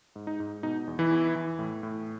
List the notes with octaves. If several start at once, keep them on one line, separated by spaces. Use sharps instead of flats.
G#2
D#4
G#2
B2 D#4
E2
E3 E4
E2
E3
A2
A2